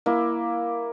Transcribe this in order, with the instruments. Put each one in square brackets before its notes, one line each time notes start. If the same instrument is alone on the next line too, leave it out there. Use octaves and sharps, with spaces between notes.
[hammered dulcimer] A#3 E4